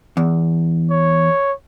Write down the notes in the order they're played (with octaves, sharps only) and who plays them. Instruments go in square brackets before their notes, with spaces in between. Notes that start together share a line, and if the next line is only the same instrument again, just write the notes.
[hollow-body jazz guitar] E2
[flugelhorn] C#5